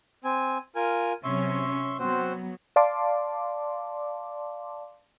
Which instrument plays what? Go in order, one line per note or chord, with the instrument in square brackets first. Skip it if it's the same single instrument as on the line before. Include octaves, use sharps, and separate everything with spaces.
[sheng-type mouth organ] C4 G#5
F4 A#4 G#5
[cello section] C3 F#3 C#4 [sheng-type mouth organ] E5 C6 C#6
[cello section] F#3 B3 [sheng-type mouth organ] C4 F#4 C5
[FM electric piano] D5 F5 A5 C6 D6